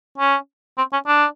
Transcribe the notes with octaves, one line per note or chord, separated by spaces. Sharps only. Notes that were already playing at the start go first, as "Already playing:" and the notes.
C#4
C4
C#4
D4